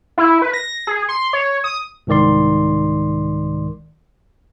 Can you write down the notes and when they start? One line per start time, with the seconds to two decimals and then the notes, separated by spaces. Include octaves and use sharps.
0.18 E4
0.42 B4
0.54 A#6
0.87 G#4
1.09 C6
1.33 C#5
1.64 D#6
2.07 C2 G#2 D#3 D5 C6